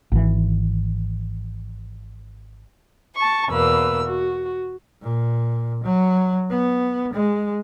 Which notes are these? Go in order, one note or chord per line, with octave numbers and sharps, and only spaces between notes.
G#1 E3
A5 C#6
E2 B2 A#3 B4 E6
F#4
A#2
F#3
B3
G#3